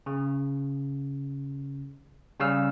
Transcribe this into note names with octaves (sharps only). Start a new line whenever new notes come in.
C#3
C#3 G3 C#4 F5 E6 F6